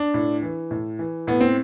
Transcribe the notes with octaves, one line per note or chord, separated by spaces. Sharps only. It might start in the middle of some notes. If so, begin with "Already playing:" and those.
Already playing: D4
A2
E3
A2
E3
A2 B3
C4